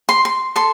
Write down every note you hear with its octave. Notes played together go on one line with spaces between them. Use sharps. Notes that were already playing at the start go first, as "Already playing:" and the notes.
C6
C6
A4 C6